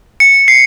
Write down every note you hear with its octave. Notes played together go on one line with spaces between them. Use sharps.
C#7
C7